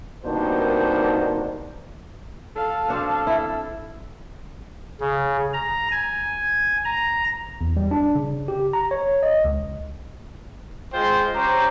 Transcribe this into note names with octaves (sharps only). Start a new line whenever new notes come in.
C2 B2 D#3 A#3 D4 C5
A4 F5 A5
C4 D4 F#4
E4
C#3
A#5
G#5
A#5
E2
G3
D4
C#3
G4
A#5
C#5
D#5
C#2
G#3 F4 G#4 C5 G5 C6
C#4 G4 C5 A#5